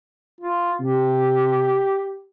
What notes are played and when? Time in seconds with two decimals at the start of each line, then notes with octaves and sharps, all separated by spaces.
0.41 F4
0.80 C3 G4